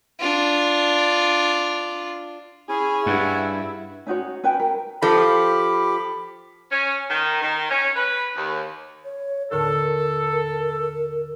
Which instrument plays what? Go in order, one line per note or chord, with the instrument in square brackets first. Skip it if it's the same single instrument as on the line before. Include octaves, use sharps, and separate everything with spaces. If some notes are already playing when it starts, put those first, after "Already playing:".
[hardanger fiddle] D4 F4
[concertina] C#4 G#5 [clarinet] E4 [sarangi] G#4
[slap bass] G2 [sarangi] E4 [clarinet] F#5
[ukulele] C#4 D#4 F#4 C#5
C#4 B4 G5 G#5
A#4
[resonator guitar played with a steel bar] F3 [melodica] G4 [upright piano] A4 [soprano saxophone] B5
[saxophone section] C#4
D#3
D#3
C#4
B4
D#2
[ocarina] C#5
[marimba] D#2 A2 D3 [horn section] A4 [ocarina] A#4
[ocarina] A#4